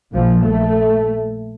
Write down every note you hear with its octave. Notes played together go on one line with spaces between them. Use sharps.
A#1 A#2 F3
A3